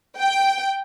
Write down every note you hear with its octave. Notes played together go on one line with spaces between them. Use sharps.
G5